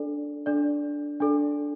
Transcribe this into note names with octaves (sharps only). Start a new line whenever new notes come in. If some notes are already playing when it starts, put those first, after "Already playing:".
Already playing: D4 A4 D5
D4 A4 D5
D4 A4 D5